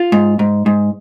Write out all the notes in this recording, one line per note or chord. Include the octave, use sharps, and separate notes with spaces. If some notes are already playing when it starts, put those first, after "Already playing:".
Already playing: F4
G#2
G#2
G#2